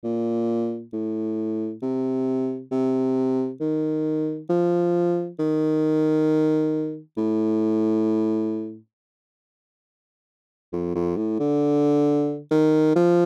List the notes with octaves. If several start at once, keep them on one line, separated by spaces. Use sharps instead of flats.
A#2
A2
C3
C3
D#3
F3
D#3
A2
F2
F2
A2
D3
D#3
F3